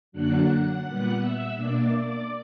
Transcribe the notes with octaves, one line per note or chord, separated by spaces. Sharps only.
F#2 D3 F#3 A#3 D4 F#5 F#6
A#2 G3 B3 F#5 F#6
E5 E6
B2 A#3 D4 D5 D6
D5 D6